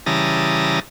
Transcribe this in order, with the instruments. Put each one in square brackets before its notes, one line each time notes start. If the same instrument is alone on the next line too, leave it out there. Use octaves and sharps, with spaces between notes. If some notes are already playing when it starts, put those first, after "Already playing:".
[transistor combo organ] C#3 E3 G3 A5 A#5 D#6